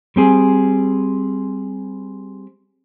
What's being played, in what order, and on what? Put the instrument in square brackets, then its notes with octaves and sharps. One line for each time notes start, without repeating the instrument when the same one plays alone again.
[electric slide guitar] G3 C4 G#4